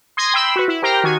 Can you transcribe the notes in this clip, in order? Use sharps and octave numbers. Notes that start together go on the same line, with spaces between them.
C6 D#6 G#6 A#6
G5 B5 C6 E6
F#4 B4
E4
G4 A#4 C5 G5 A#5 F6
D#3 F#4 G#5